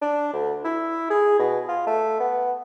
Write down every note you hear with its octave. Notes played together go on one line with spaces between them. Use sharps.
D4
D2
E4
G#4
B2
F4
A3
B3